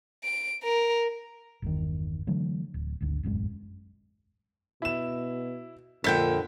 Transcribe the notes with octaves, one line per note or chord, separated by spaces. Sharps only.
D7
A#4
G1 E2 D#3
D3 E3 F#3 A3
D1
G#1 D2
E1 A1 F#2 G#3
B2 E4 E7
F2 A#2 D3 G5 G6 B6